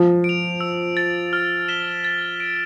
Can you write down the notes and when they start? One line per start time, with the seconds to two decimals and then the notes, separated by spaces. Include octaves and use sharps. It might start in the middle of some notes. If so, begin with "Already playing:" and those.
Already playing: F3
0.24 D7
0.29 F7
0.61 E6
0.97 A6 D7
1.33 F6
1.68 B6 E7 G7
2.05 A6
2.40 D7 G7